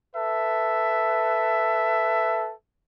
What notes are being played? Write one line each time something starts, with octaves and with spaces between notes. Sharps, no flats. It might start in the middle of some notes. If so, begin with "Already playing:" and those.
A4 B4 E5